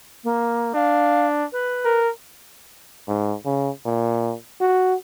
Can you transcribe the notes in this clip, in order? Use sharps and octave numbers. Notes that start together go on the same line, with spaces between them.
A#3
D4 F5
B4
A#4
G#2
C#3
A#2
F#4